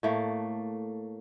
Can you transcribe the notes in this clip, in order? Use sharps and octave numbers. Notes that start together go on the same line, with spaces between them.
A2 A3 A#3